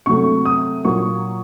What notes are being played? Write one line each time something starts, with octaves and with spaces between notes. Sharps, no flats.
C3 F#3 A3 C#6
D#6
A#2 F#3 A#3 C#6